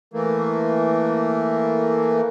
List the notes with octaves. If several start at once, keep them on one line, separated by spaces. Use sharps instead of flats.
E3 A3 A#3